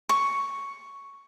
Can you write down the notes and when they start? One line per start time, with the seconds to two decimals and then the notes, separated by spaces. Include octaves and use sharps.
0.09 C#6